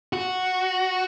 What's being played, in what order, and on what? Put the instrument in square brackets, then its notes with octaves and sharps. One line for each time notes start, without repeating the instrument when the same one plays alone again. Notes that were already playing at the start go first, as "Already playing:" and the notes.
[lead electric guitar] F#4